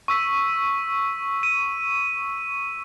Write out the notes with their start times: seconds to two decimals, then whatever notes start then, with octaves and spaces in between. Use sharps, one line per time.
0.08 C#6 E6 B6
1.43 D#7